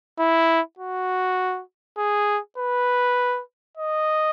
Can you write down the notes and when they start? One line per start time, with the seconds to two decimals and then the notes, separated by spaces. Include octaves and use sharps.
0.19 E4
0.79 F#4
1.98 G#4
2.58 B4
3.77 D#5